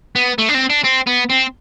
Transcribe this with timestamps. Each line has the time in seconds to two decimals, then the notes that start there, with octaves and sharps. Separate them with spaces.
0.15 B3
0.38 A3
0.48 D4
0.54 C4
0.70 D4
0.84 C4
1.07 B3
1.30 C4